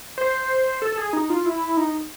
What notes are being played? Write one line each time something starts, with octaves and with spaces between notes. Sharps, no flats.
C5
A4
A4
G#4
D#4
F4
E4
D#4